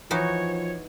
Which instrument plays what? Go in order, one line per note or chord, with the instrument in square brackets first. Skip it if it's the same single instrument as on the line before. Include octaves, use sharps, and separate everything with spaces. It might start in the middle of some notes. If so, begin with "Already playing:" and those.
[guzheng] E3 D#4 F#4 [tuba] F3 [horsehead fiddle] C#5